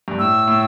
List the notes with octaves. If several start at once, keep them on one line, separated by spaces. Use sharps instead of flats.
G2
A2 E6
A2